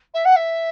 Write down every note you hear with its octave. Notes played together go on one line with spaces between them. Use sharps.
E5
F#5
E5